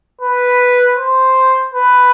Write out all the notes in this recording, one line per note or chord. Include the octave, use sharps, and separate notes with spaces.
B4
C5
B4